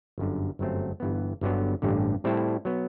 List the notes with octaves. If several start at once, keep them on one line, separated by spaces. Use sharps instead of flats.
G1 F#2 D3
G1 F#2 F#3 A3 C4
G1 G2 E3 B3
G1 G2 D3 F#3 B3
A1 G2 D3
A2 G3 C4 E4 A4
F#3 B3